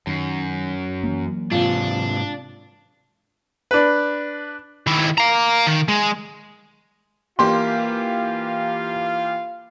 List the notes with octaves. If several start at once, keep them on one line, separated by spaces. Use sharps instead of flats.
F#2 D#3
E3 F#3 A#3
G#2 C3 D4 F4
D4 B4
D#3 E4
F5 A#5
D#3
G#3
E3 A#3 F4 G4 F5 C6